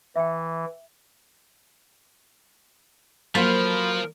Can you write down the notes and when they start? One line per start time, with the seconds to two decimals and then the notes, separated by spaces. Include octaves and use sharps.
0.16 E3 E5 G5
3.35 F3 F#3 A3 A#3 F4 A#4 C5 B5